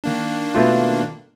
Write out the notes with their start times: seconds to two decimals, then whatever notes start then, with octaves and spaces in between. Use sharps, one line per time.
0.04 D#3 A#3 D4
0.55 B2 A3 F4